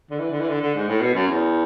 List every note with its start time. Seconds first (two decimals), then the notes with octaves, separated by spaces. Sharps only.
0.10 D3
0.19 E3
0.30 D3
0.40 E3
0.49 D3
0.62 D3
0.75 G#2
0.88 A2
1.01 B2
1.14 F#2
1.28 E2